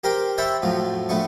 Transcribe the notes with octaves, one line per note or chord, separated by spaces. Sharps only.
G4 A#4 C5 G5
C5 C#5 E5 G5 A5 B5
F2 A2 F3 F#3
A#1 A2 A3 B3 C#6